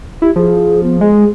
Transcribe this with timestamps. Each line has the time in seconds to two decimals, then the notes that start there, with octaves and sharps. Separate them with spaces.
0.22 E4 G4
0.36 F3 G#4
0.83 B3
1.01 G#3 G#4